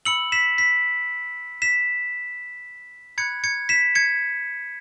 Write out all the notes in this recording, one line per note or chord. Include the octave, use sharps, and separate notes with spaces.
B5 E6 C#7 F#7
B6 E7
B6
B6 E7
B5 F#6 G#6 C#7
G#6 C#7
B6 E7
G#6 C#7